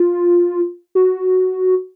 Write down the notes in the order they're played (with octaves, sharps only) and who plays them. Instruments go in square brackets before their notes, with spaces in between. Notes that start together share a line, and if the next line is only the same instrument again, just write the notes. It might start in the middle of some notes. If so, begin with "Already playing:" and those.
Already playing: [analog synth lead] F4
F#4